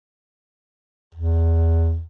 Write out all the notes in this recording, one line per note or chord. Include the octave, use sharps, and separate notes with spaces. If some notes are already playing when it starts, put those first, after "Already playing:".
E2